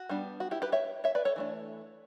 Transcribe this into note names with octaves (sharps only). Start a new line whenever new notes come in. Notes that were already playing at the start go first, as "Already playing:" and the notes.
Already playing: F#4
G3 B3 D4
F#4
E4 G4
G4 B4
C#5 E5
C#5 E5
B4 D5
A4 C#5
E3 A3 D4